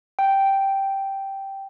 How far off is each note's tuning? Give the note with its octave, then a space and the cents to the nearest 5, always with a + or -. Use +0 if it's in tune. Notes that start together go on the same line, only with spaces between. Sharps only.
G5 -5